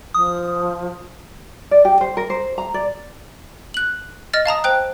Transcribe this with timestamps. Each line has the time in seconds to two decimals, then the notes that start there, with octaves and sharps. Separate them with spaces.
0.14 F3 D#6
1.71 D5
1.85 G4
2.01 C5
2.17 A#4
2.30 C5
2.58 A#5
2.74 D5
3.74 F#6 F#7
4.33 D#5 F6 A6
4.46 F5 A5 A#5 D#6
4.64 C5 G5 F#6